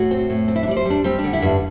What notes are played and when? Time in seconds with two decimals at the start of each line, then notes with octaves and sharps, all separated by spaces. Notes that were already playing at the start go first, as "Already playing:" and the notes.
Already playing: A2 F#4
0.11 C4
0.30 A2
0.48 C4
0.56 E4
0.63 D4
0.68 G3 D5
0.77 C5
0.85 G3 D4
1.04 G3 C4
1.18 D4
1.24 D3
1.33 E4
1.42 G2 D4